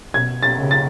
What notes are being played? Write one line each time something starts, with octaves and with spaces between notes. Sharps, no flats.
B2 G#6
A6
C#3
A6